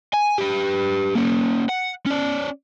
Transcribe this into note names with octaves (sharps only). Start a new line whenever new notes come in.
G#5
G4 B4
A#3 C#4
F#5
C#4 D5